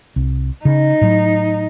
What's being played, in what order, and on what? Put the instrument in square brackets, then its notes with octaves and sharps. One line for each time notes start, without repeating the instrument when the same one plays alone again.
[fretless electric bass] C2
[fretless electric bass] C#3 [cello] D#4
[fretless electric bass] A2 F#3